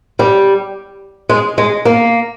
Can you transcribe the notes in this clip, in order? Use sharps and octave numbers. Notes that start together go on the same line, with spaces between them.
G3
G#3
G#3
A#3